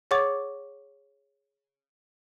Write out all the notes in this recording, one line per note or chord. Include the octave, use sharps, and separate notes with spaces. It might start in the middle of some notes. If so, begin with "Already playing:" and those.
G#4 C#5 F#5 C#6 D6 A6